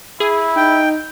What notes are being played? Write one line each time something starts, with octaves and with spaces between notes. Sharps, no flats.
E4 G#4
D#4 G5